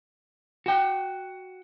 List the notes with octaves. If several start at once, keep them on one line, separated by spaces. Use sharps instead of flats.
F#4 G5